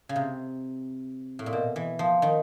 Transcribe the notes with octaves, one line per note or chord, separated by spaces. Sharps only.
C#3
C3
A2
A#2
B2
E3
F3
D#3